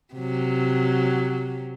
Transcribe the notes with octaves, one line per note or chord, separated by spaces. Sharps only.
C3 F#3